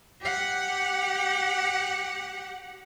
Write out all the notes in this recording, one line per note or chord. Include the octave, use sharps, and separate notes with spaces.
G4 F#5